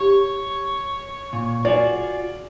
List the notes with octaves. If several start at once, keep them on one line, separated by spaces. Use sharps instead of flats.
G4 C#5
A#2 C#6
F4 F#4 G#4 D5